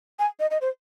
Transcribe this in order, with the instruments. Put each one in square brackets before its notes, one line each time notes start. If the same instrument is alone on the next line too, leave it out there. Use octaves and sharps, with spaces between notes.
[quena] G#5
D#5
D#5
C5